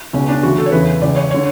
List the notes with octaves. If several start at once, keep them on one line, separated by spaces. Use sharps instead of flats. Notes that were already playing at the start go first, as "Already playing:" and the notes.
C#2 B2 C#4
D4
D2 C#3 E3 F#4
A4
C#5
E2 C#3 E3 B4
C#2 C#3 E3 D5
C#5
D3 C#5